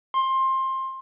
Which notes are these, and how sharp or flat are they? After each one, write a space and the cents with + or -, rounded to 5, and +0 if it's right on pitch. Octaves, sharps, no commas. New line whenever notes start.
C6 +20